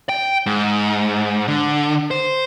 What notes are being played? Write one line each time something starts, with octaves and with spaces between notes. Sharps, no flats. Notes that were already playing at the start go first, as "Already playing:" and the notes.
G5
G#2
D3
C5